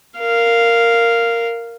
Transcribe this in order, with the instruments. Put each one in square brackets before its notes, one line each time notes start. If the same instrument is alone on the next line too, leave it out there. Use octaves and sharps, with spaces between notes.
[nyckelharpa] A#4 F5